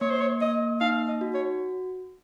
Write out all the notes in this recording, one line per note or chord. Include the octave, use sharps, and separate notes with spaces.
A#3 C#5
C5
C#5
A#3 D#5
D#4 F5
D#5
F#4
C#5